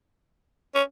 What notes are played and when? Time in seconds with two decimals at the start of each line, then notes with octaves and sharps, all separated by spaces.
0.75 C#4